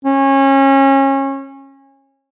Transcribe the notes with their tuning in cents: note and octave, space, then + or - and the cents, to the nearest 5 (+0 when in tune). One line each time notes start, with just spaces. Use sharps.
C#4 -25